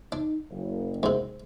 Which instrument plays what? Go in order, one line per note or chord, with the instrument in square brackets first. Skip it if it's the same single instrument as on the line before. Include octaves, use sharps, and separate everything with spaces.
[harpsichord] D4 [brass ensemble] D#4
[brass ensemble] F#1
[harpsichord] G#2 C3